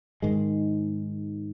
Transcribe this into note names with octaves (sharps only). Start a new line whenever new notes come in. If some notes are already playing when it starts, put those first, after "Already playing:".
G#2 D#3 G#3